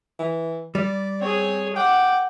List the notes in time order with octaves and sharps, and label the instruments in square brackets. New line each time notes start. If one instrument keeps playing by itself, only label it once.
[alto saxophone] E3
[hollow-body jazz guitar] G3 [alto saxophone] D5
[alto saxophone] C4 [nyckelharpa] G#4 C#5
[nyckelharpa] F#5 D6 [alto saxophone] G5